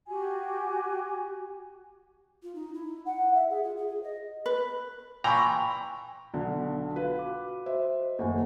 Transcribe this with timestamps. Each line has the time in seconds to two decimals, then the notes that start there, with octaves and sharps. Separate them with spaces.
0.08 F#4 G4 G#5
2.42 F4
2.54 D#4
2.74 E4
3.05 F#5
3.34 E5
3.49 G#4
3.63 F4
3.76 G#4
3.87 G#4
4.03 D#5
4.46 B4
5.24 A#2 E3 G5 G#5 A#5 B5 C#6
6.34 B1 D3
6.96 F4 F#4 B4 F5
7.16 F#4 D6
7.66 C5 D#5 E5
8.19 F#1 D#2 A4 F#5 G#5